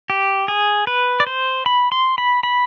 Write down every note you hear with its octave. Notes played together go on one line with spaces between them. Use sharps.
G4
G#4
B4
D5
C5
B5
C6
B5
B5